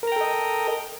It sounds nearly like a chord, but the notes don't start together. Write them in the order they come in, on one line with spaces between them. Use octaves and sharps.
A#4 A#5 G5 A4 D#5